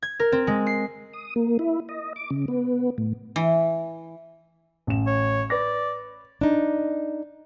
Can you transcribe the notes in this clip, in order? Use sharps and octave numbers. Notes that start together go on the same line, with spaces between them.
G#6
A#4
C4
G#3
C7
D#6
A#3
E4
D#5
D6
C#3
B3
A2
E3
A1 E7
C#5
B4 D5 A#6
D4 D#4